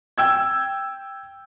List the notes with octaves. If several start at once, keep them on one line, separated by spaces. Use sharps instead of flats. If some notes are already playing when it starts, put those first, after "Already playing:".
G5 E6 G#6